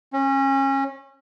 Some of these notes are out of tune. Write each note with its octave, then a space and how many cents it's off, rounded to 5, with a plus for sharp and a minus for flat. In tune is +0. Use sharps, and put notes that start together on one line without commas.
C#4 -25